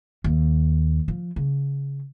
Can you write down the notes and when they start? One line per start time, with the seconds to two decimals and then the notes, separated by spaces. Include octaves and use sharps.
0.24 D#2
1.08 F3
1.36 C#3